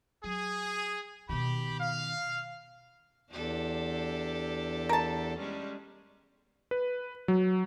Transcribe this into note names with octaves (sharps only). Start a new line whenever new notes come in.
F#3 G#4
B2 D#3 G4 B5
F5
E2 D4 G4 A4
A#4 A5
G3 G#3 C#4
B4
F#3